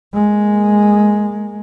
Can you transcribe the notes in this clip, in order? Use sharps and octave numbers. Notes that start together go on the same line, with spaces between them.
G#3 A#3